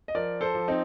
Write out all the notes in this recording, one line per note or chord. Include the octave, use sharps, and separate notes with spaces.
D#5
F3 A#4 D5
A4 C5
F3
C4 D#4